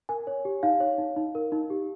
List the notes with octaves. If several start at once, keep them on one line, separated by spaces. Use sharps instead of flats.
A#4 G#5
C#5
G4
D#4 F5
C#5
D#4
D#4
A#4
D#4
G4